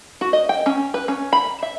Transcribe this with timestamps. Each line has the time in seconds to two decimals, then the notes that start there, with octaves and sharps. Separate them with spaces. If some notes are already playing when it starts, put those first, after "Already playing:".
0.21 F#4
0.33 D#5
0.49 G5
0.66 C#4
0.94 B4
1.08 C#4
1.33 B5
1.63 E5